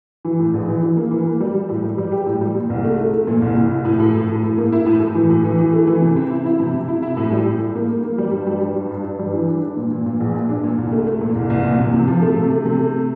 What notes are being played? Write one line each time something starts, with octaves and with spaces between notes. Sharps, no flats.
E3
A2
A#1
E3
E3
A#3
E3
A#3
G3
G3
A2
G3
G3
G4
A2
G3
A#2
C2
A3
A3
A3
A#2
C2
C2
E4
A2
A2
A2
A2
A2
A#3
E4
A2
A2
E3
A2
E3
E3
A3
E3
C3
C4
E4
E4
C3
C3
E4
E4
A2
G3
A2
A2
A#3
A#3
A#3
G3
G2
G3
G3
G2
G2
G2
G3
E3
D4
D4
A#2
A#2
A#2
A#1
A#2
D4
A#2
C2
A3
A3
A#2
C2
C2
A#2
C3
C3
F3
A3
C3
A3
C3
A3